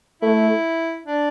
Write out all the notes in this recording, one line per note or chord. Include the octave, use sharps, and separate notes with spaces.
A3 E4
D4